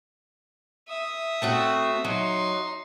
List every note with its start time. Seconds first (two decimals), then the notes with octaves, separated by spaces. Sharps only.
0.88 E5 D#6
1.42 A3 C4 F#4
2.05 F#3 D#4 C6